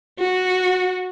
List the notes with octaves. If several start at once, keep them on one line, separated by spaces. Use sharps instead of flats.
F#4